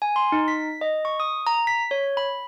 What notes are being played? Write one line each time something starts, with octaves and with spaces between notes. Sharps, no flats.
G#5
C6
D#4
B6
D#5
C#6
D#6
A#5
B6
C#5
B5